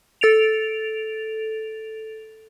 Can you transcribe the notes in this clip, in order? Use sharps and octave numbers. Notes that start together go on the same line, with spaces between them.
A4 A6 D7 F7